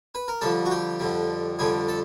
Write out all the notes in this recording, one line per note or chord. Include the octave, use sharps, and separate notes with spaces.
B4
A#4
F2 D3 G3 A4
F#4
G4
F2 D3 G3
F2 D3 G3 G#4
A4